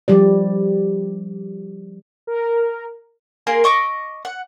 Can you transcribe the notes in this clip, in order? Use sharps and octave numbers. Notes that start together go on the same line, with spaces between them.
F3 G3 G4 D5
A#4
A#3 G#4 A#4 C6
D#5 C#6 D6 E6
F#5